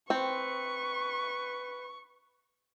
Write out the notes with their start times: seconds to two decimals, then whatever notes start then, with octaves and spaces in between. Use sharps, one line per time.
0.10 C4 B4 C#6